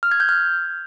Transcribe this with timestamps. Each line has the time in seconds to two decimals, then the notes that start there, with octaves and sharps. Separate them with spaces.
0.03 F6
0.11 G#6
0.20 G6
0.29 F6